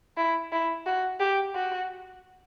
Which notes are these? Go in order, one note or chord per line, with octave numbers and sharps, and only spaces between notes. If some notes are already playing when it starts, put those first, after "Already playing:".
E4
E4
F#4
G4
F#4